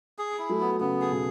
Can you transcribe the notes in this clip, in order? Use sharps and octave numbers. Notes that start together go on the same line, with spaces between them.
G#4
E4
F#3 A3
B3
C#3 B3
G#4
B2